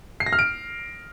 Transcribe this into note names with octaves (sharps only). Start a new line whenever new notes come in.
C7
A#6
F6
D7